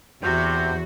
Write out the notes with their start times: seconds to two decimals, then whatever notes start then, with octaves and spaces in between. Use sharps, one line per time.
0.23 E2 C3 F#4 G6